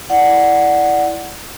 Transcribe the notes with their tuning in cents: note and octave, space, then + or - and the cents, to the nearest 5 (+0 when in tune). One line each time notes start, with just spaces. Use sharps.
E4 +0 D5 +0 F#5 +0